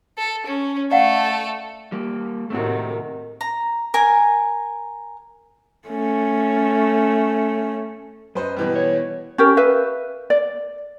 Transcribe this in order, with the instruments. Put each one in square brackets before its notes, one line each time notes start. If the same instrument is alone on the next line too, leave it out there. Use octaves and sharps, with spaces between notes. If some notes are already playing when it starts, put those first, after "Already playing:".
[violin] A4
C#4
[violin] A3 A4 [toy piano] D5 F5 F#5
[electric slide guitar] G3 A#3
[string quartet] A2 C3 D#3 [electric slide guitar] A3 C4 F#4
[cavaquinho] A#5
A#4 G#5
[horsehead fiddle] A3 C#4
[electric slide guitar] F#2 [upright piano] B4 C5 D#5
[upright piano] B2 E3 G3
[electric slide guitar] C#5
[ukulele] C#4 G4 A#4
B4 E5 F5
D5